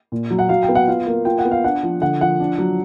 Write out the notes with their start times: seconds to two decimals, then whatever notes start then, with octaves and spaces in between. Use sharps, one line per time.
0.12 A#2
0.30 F#3
0.39 F#5
0.49 F#3 F5
0.63 G5
0.69 B3
0.75 F#5
0.88 F4 F5
1.07 A#3
1.25 F4 G5
1.38 F#5
1.45 B3
1.51 F5
1.64 D4 F#5
1.83 F3
2.01 D3 F#5
2.20 F3 F#5
2.40 D4
2.58 F#3